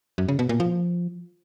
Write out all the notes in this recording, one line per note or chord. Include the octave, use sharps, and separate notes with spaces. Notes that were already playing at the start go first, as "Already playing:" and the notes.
F#2
C#3
B2
A#2
F3